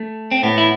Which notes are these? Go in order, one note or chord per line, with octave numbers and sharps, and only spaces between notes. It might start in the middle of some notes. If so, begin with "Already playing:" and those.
Already playing: A3
C4
A2 B3
E4